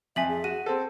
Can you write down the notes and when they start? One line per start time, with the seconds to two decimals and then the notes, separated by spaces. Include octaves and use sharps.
0.16 F2 E5 G#5 B6 F#7
0.29 G#4
0.44 F#4 D#7
0.66 C4 A4